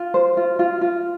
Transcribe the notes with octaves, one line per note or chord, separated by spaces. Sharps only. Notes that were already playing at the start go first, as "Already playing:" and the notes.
Already playing: F4
C5
F4
F4
F4